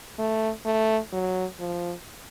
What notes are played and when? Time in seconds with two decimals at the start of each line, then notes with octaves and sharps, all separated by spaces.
0.18 A3
0.66 A3
1.12 F#3
1.60 F3